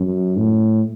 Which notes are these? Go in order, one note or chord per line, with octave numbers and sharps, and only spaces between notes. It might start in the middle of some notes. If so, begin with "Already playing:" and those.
Already playing: F#2
A2